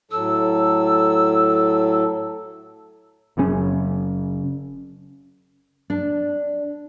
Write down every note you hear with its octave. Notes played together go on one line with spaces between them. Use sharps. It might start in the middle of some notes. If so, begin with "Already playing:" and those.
A2 F#3 A4 E6
F#1 F#2 C#3 C#4
D4